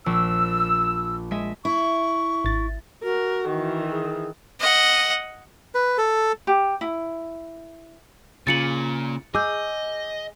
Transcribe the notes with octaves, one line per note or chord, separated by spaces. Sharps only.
A#1 E6
G#3 D#5 E5
E4 C#6
G#1 A6
F#4 A#4
D#3 E3
G#4
D#5 F#5
B4
A4
G4
E4
A#2 C#3 F4 A6 C#7 F#7
G#4 D#5 D6 E6 G6